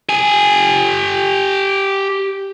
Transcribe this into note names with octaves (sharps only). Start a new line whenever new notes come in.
G4 G#5